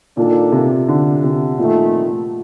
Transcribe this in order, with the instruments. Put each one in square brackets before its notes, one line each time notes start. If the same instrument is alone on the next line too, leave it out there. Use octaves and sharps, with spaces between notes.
[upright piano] A#2 [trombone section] D#3 A#3 D4 A4
[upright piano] C3
D3
C3
[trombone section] F2 D#3 A3 [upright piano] A#2